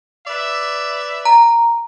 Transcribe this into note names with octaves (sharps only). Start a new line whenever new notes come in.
B4 D5 E5
A#5